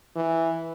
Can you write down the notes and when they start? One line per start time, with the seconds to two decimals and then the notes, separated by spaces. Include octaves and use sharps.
0.16 E3